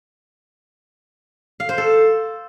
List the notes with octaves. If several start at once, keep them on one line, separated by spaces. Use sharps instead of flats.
F5
C5
A4